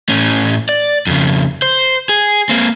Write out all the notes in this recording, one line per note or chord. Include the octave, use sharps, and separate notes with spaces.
A2 C#4
D5
F2 C#3
C5
G#4
A#3 C4